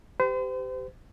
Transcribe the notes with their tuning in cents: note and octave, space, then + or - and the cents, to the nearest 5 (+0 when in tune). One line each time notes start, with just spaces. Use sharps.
G4 +0 C5 -40